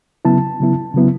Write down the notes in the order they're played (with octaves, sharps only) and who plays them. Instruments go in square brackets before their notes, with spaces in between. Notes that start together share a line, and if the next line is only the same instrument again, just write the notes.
[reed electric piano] C#3 F#3 B3 E4 A5
C#3 F#3 B3 E4
C#3 F#3 B3 E4